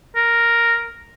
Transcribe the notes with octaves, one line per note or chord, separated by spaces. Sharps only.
A#4